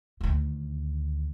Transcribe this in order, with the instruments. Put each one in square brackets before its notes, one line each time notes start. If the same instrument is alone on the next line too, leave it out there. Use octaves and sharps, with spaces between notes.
[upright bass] D2 D#3